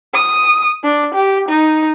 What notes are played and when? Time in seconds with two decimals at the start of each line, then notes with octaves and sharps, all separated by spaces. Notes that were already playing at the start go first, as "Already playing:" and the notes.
0.14 D#6
0.84 D4
1.14 G4
1.49 D#4